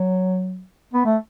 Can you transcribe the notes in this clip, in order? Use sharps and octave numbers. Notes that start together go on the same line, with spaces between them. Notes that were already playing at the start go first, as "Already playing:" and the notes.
Already playing: F#3
B3
A3